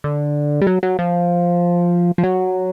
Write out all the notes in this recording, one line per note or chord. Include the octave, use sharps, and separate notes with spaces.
D3
G3
F#3
F#3
F3
F3
F#3